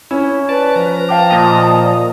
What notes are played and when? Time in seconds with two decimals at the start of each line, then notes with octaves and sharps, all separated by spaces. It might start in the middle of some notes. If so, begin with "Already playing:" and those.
0.11 C#4 E4
0.49 B4 D5 A5
0.76 F3 A#5
1.09 F5 G5 A5 D6
1.30 A#2 D#5